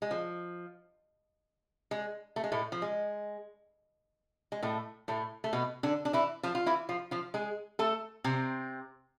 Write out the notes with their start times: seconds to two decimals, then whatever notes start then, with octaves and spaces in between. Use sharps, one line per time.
0.02 G#3
0.11 F3
1.91 G#3
2.36 A3
2.44 G#3
2.52 A2 A3
2.72 F3
2.82 G#3
4.52 G#3
4.63 A2 A3
5.08 A2 A3
5.44 A3
5.53 B2 B3
5.83 D3 D4
6.05 D4
6.13 E3 E4
6.43 F3 F4
6.55 F4
6.66 E3 E4
6.89 F3 F4
7.11 F3 F4
7.34 G#3 G#4
7.79 A3 A4
8.24 C3 C4